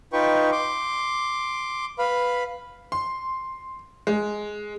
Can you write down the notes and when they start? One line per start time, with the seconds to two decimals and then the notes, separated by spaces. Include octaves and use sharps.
0.13 D#4 F4 B4 G5 C#6
0.52 C6 D6
1.99 B4 F5 B5
2.92 C6
4.07 G#3